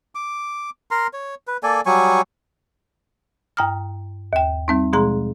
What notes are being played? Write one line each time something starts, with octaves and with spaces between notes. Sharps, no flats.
D6
A#4 A#5 C6
C#5
B4
A#3 A4 D5 G#5
F#3 G3 G#5 C#6
G2 G5 A#5 D#6 F6
D#2 G5
G3 C4 D#4
B2 F3 G#3 G#4 A#5 C6